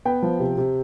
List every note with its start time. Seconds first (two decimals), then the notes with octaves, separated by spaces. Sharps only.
0.05 B3 G5
0.23 F3
0.40 C3
0.58 C3